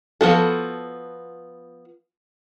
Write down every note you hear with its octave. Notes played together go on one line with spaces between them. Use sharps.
F3 B3 F#4 A4